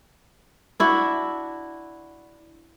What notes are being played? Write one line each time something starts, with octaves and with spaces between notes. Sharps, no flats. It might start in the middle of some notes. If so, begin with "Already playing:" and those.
D4 E4 F#4